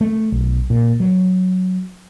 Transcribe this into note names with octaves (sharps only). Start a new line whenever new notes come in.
A3
B1
A#2
F#3